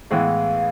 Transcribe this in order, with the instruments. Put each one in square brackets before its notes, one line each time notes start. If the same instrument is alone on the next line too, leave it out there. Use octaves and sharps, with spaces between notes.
[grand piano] A2 E3 G#3 B3 [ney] F5